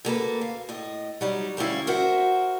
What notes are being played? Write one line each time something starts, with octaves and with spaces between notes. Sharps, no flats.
D2 A#3 A4 B4
F5
A2 D#5
F#3 G3 D#4
D2 G3 C#4 E4 F5
F#4 A#4 C5 E5 F#5